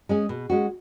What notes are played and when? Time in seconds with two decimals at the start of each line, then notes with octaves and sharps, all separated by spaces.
0.09 G#3 C#4 G#4
0.29 B2
0.50 G#3 C#4 F#4